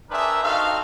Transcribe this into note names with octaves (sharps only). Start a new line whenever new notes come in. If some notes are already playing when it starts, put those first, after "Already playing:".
C4 D4 G#4 A#4 B4 E5
C4 D#4 F#4 A4 F5